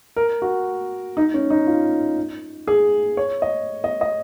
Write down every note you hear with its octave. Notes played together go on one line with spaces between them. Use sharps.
A#4
F#4
D#4
C#4
D#4
F4
G#4
C#5
D#5
D#5
D#5